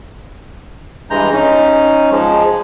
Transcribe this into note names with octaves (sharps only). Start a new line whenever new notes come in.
G2 E3 G#3 A#5 G6
C#4 D#4
F3 G#3